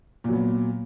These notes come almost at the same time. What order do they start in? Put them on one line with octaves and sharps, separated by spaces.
A#2 F#3 B3